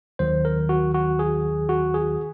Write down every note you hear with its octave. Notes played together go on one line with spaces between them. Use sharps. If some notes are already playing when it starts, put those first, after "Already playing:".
D#2 D#3 F#3 C5
A#4
F#4
F#4
G#4
F#4
G#4